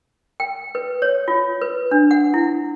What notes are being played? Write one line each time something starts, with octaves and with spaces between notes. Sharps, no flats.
G5
B4
C#5
F4
B4
D4
F#5
E4